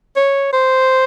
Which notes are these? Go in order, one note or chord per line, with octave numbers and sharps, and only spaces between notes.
C#5
C5